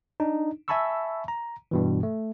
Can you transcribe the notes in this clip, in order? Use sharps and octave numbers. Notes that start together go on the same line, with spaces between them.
D4 D#4
E5 G#5 A5 B5 C#6 E6
A#5
G2 B2 E3
A3